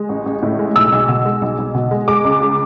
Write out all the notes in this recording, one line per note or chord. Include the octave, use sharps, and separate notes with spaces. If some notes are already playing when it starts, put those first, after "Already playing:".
Already playing: G#3
A1
A1
A2
G#3
B1 E6
B1
B2
G#3
B1
B1
B2
G#3
G#3 D6
C#2
C#3